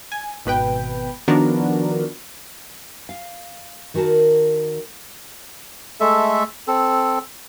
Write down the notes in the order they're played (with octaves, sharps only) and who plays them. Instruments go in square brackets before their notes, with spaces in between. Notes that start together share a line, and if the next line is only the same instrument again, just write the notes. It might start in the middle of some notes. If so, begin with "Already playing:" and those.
[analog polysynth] G#5
G#1 B2 B4 G5
D#3 F3 B3 D4 F#4 A#4
[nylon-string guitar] F5
D#3 F#4 A#4 G5 A5
[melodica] G#3 A3 A4 E5
C4 A4